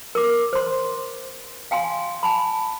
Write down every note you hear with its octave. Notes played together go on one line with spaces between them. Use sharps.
A#4 D6
C5 C6
F5 G5 G#5 C6
G#5 A5 B5